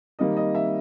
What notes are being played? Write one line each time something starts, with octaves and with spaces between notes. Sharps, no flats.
D#3 G3 A#3 D#5
D#5
E5